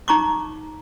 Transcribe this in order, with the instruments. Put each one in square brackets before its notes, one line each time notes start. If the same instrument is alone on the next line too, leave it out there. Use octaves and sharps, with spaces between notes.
[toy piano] D#4 A#5 C#6 D6